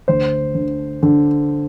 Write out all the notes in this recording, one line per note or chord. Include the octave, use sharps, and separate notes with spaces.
D2 C5
D3
D3